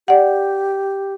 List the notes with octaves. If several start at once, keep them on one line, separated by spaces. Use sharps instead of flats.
G4 D5 F#5